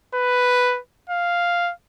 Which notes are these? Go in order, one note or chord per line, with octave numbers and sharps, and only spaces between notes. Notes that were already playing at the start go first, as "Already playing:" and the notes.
B4
F5